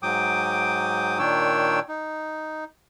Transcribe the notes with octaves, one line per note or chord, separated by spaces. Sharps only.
G#2 F#3 G5 D6 D#6
A#2 D#3 D4 C#5 G5 E6
D#4